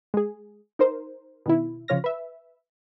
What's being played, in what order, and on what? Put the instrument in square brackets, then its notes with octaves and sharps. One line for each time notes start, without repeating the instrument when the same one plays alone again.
[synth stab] G#3 G#4
D#4 A#4 C5
B2 D#3 E4
C#3 F3 F4 C#5 F6 A#6
B4 E5